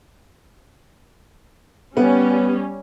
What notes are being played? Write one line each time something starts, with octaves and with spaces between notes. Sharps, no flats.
G3 B3 C#4